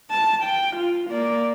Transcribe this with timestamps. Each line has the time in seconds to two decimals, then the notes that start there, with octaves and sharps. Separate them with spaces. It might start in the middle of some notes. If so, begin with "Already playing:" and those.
0.11 A5
0.44 G5
0.77 F4
1.11 A#3 D5